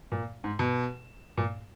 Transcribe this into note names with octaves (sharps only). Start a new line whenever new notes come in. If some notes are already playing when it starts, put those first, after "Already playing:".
A#2
G#2
B2
A#2